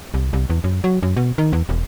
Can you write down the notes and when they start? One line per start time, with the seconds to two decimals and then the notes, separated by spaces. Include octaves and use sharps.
0.14 C2
0.33 C2
0.50 E2
0.64 F#2
0.84 F#3
1.03 F#2
1.17 B2
1.38 D#3
1.53 E2
1.69 E1